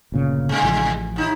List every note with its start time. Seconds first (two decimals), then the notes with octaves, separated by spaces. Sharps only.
0.12 G1 A#2 C#3
0.49 C3 G#3
0.63 A1 F3
1.16 D#2 D#4 E4